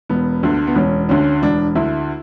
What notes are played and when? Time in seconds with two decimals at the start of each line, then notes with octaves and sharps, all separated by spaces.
0.09 E1 B3
0.43 D2 D3
0.67 B3
0.75 E1 C#4
1.09 D2 D3 C#4
1.42 E1 D4
1.75 D2 D3 E4